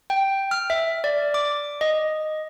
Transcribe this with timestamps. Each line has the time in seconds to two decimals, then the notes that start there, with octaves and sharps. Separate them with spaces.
0.10 G5
0.51 F6
0.70 E5
1.04 D5
1.34 D6
1.81 D#5